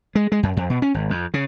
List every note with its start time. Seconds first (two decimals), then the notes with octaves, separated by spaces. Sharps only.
0.15 G#3
0.32 G#3
0.43 F#2
0.57 F2
0.70 B2
0.82 C#4
0.94 G#1
1.10 F2
1.34 C#3